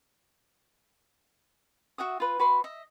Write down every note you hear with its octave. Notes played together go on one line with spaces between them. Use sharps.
F#4 E5 F#5 D#6
F4 B4
F#4 B4 B5 C6
D#5 E5